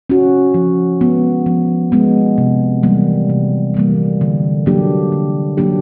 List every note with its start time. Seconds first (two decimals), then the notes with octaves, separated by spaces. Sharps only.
0.10 C#4 F#4
0.54 F3
1.01 G#3 B3
1.46 F3
1.92 G#3 B3
2.38 C3
2.83 E3 G3 A#3
3.29 C3
3.74 E3 G3 A#3
4.21 D3
4.66 F#3 A#3 D4 G4
5.12 D3
5.57 F#3 A#3 D4 G4